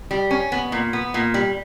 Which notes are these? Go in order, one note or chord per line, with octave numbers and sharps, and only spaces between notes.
G3
C#4
B3
A#2
B3
A#2
G3